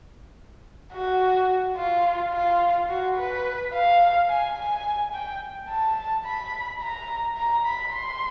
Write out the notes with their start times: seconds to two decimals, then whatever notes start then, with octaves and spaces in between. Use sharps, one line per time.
0.93 F#4
1.77 F4
2.33 F4
2.89 F#4
3.17 B4
3.73 F5
4.29 G#5
4.57 G#5
5.13 G5
5.69 A5
6.25 B5
6.81 A#5
7.37 A#5
7.66 B5
7.94 C6